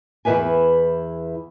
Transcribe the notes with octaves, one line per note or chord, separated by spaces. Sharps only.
E2 D#3 E4 B4 G#5